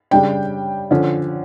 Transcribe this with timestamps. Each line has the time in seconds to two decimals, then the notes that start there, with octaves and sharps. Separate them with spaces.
0.11 C#3 G3 D4 G5
0.91 D3 F3 C#4